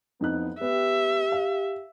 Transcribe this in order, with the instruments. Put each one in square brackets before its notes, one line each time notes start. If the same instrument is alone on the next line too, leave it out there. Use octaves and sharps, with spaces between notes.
[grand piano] F2 D#4 F#6 [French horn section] E3 F3 B3
[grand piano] B3 [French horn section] G4 [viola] E5
[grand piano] F5